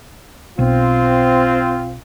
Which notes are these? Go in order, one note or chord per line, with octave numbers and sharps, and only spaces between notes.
B1 C4 F4